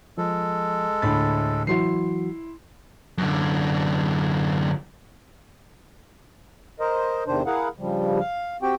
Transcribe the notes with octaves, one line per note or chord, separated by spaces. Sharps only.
F3 G#3 A4
D2 A2 B5 A6
E3 F#3 E4 F#4 C6 C7
F#2 D3
A#4 C5 D#5
E2 C3 D#3 D4 C5
E4 G#4 A#4 F5 F#5
G2 C#3 F3 G3
F5
C4 F#4 G4 G5